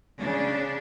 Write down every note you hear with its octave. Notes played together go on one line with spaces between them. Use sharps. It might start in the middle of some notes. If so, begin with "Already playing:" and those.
C#3 D4